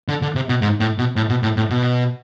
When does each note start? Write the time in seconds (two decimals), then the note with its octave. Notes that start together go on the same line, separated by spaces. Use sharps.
0.08 D3
0.22 D3
0.35 C3
0.49 B2
0.62 G#2
0.80 A2
0.98 B2
1.16 A2
1.29 B2
1.43 A2
1.57 A2
1.70 B2